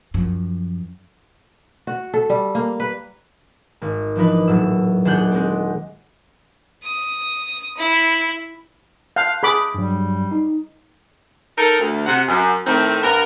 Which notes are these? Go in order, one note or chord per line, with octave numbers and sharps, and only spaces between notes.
F#2 F3
F#4
A4
G3
A#3
B4
G#1
E3 F3 D4 D#4 B4
D#1 A2 F#3 E6
D#1 D4 G#4 F#5 F#6 G6
G#3 C4
D#6
E4
F5 A5 F#6 G6
G#4 B5 D6
G2 F#3 G3
D#4
D#4 A4 A#4
D2
C3 F#5
F#2
A2 D#3 A3 C4
G2 B3 A#4